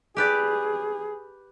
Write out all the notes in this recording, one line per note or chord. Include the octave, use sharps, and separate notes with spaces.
G4 G#4 B4 D5